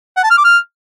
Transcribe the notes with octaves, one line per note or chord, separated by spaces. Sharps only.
F#5
A5
F6
D6
F6